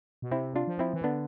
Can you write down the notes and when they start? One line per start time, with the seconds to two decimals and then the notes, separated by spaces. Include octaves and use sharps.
0.22 B2
0.31 C3 C4 E4
0.56 D4 F4
0.67 F3
0.79 C4 E4
0.94 E3
1.03 D3 B3 D4